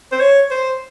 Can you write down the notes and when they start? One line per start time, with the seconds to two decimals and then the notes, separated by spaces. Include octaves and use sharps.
0.12 C5
0.20 C#5
0.51 C5